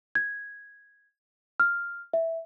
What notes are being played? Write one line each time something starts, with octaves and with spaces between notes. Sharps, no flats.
G#6
F6
E5